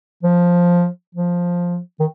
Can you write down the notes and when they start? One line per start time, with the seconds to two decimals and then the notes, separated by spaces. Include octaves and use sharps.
0.23 F3
1.15 F3
1.99 D#3